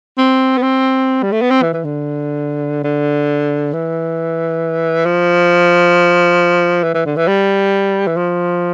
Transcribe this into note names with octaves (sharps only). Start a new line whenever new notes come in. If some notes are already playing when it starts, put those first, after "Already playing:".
C4
B3
C4
G3
A3
B3
C4
E3
E3
D3
D3
E3
F3
E3
E3
D3
E3
G3
E3
F3